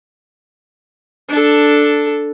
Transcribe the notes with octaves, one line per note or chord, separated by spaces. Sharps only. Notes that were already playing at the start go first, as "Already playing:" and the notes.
D4 A4